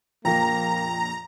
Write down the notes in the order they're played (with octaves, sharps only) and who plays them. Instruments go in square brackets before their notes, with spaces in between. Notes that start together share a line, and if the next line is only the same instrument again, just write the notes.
[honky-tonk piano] A#1 F2 A#2 [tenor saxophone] A#3 [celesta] G5 A#6 [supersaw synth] A#5